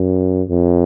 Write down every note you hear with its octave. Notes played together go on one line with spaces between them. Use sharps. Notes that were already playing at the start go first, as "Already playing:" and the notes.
Already playing: F#2
F2